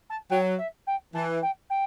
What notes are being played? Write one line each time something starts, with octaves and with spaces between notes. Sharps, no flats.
A5
F#3 G5
E5
G5
E3 A5
G5
G5